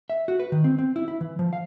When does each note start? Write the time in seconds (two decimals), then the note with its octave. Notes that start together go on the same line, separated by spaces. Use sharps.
0.10 E5
0.28 F#4
0.40 B4
0.52 D#3
0.64 C4
0.78 C4
0.96 E4
1.08 E4
1.21 E3
1.39 F3
1.53 F5